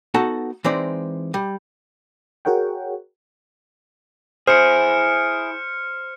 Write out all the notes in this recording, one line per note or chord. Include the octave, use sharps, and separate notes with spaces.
B3 D#4 F#4 A4 F#5 A5
E3 G#3 C4 D#4 D5
G3
F#4 G#4 A#4 C#5 F#5 G5
E4 G#4 C5 F6 C#7